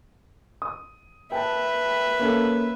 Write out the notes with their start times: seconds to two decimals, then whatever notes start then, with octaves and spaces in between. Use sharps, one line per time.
0.62 D#6
1.32 B4 E5 G5 A5
2.19 A#3 C#4 A4